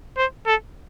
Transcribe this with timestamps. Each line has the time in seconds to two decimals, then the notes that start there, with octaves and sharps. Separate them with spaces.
0.17 C5
0.46 A4